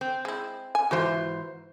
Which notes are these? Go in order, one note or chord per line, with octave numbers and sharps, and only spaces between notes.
C4
G#3 E4
G#5
G#2 E3 F4 F#4 C5